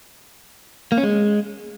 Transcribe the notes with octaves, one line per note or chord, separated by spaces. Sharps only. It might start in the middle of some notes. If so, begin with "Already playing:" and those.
A#3
C#4
G#3